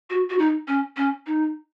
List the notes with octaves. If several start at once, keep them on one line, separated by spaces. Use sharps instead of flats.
F#4
F#4
D#4
C#4
C#4
D#4